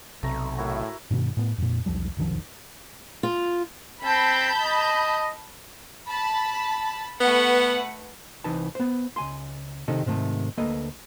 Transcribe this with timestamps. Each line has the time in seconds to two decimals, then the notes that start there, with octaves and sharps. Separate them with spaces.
0.23 B1 C3 A3 D5 A#5
0.57 A2 E4 F#4 A#4
1.11 G2 B2 D#3
1.37 A2 B3
1.58 F2 A#2
1.86 B1 E2 F3 G3
2.17 F1 B1 D#3 F3
3.23 F4
4.04 C4 A5 B5 G6
4.60 D#5
6.08 A5 B5
7.20 A3 B3 B4 F#5
8.44 C2 E3 D#4 B4 A5
8.75 B3 C5
9.16 C#2 G#5 C6
9.88 C3 D#3 D#4 G4 A4 D#5
10.06 G#2 C3 D#3 A3
10.57 D2 A#3 A4 B4 D#5